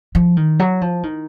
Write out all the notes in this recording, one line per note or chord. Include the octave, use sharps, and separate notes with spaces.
F3
D#3
F#3
F3
D#3